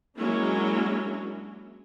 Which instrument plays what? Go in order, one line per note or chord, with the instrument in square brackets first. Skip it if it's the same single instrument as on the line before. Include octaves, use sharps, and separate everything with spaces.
[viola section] F#3 G#3 A#3 C#4 D4 E4